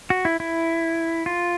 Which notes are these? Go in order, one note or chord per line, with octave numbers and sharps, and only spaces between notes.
F#4
E4
E4
F4